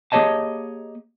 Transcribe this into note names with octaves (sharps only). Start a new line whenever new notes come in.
A#3 G4 G#4 C#5 D#5 A5